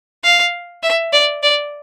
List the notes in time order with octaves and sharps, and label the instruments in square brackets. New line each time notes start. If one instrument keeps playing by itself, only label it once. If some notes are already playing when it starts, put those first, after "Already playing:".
[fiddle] F5
E5
D5
D5